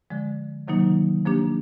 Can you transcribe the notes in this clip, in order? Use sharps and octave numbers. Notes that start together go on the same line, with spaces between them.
D3 F3 G#3
C3 D#3 F#3 A#3 D#4
F3 A#3 D4 G4